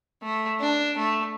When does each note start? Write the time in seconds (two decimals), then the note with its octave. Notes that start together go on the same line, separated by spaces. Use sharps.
0.22 A3
0.60 D4
0.97 A3